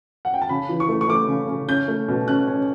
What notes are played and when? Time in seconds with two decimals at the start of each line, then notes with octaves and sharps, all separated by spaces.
0.25 F#5
0.34 G5
0.42 A5
0.49 C#3 B5
0.69 E3
0.80 C#6
0.89 A3
1.01 C#6
1.09 A3 D6
1.28 C#3
1.48 C#3
1.68 C#4 G6
1.88 A3
2.08 B2
2.27 C#4 F#6
2.48 C#4